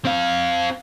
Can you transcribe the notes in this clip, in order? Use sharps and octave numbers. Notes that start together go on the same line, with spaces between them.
C4 F5